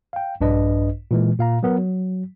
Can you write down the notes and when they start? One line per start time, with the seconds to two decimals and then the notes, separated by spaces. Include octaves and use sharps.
0.13 F5 G5
0.41 A#1 G2 D4 B4 D#5
1.11 A#2 E3 G#3
1.39 A#2 F5 A#5
1.63 F#3 B3 A#4
1.78 F#3